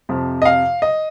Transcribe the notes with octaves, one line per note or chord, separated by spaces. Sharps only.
F2 C3 F3
D#5
F5
D#5